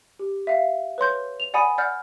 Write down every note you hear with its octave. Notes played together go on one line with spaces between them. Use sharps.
G4
E5 F5
B4 C#5 C6 G6
F7
D5 F#5 G#5 B5 D#6
D5 F#5 F6 G6